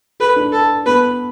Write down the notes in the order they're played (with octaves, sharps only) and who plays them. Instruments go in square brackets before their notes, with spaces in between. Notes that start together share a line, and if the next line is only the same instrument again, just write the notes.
[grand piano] A4 [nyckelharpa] B4
[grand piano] D4
[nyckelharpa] A4
[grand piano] B3 [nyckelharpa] B4